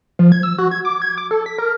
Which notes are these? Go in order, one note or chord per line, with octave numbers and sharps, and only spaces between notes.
F3
G#6
E6
F#4
G#6
D6
G#6
D6
A4
B6
A#4